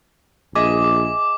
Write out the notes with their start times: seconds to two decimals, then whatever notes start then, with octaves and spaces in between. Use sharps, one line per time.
0.55 A#1 G#4 D#5 E5 D6